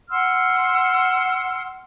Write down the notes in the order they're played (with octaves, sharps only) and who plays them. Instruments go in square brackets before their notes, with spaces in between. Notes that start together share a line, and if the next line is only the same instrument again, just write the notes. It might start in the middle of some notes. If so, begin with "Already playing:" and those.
[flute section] F#5 C6 E6 F6